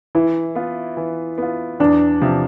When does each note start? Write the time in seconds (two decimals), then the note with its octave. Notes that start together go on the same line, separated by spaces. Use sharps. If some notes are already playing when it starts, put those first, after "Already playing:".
0.15 E3 E4
0.55 B3 F4
0.97 E3
1.38 B3 F4
1.80 E2 D4
2.22 C3 F3